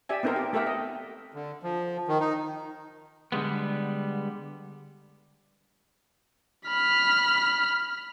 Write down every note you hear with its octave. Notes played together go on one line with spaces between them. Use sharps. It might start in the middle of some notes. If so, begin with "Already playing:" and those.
G4 D5 E5 G#5
B3 C4 D#4 A4 A#4 C5
G4
A3 G4 A4 A#4 E5 F#5
D#5
D3
F3
D#3
D#4
D3 G3 G#3 B3
B5 F6